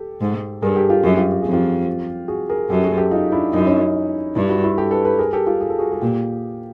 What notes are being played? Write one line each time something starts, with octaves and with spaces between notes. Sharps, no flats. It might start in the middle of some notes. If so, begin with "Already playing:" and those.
Already playing: G4 A4
G#2
G2 G#4 A#4
G4 A4
F4 G4
F#2 F#4 G#4
F4 G4
G4
F2 G#4
F4 G4
F#4 G#4
G#4 A#4
F#2 G4 A4
F#4 G#4
G4 A4
D#4 F4
D4 E4
F#2 D#4
E4
C#4 D#4
G2 D4 E4
E4 F#4
E4 F#4
G4 A4
A4 B4
A4 B4
G#4 A#4
G4 A4
F4 G4
G#4
A4
F#4 G#4
G#4
A#2 F4 G4